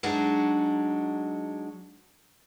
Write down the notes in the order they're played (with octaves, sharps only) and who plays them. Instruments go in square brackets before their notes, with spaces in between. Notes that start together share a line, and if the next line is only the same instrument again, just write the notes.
[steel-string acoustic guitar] F#3 G#3 D4 D#4 F#4